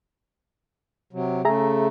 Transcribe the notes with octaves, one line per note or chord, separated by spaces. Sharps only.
C3 F#3
C#3 A3 G#4 E5 A#5